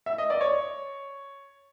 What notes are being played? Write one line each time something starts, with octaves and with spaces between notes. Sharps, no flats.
E5
D#5
D5
C#5